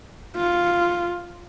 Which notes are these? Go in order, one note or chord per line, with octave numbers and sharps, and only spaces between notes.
F4